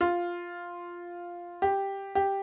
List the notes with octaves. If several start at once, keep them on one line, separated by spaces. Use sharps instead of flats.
F4
G4
G4